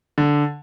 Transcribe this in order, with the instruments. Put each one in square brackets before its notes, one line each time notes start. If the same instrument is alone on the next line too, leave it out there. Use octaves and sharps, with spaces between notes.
[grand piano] D3